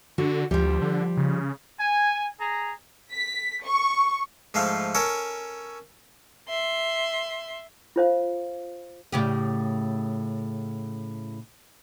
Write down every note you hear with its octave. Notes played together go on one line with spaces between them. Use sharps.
D3 F#4
D2 F3 G3
D3
C#3
G#5
G#4 A#5
B6
C#6
G#2 F3 A3 F4 F5
C#4 A4 A#4 C#5
E5 C6
F4 C5 F5
A2 C#3 G4